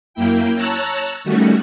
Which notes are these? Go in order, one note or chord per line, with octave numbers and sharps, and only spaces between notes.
F#2 A#3 E4 G5
C#5 A5 A#5 E6 F#6
D#3 G3 A3 C#4 F#4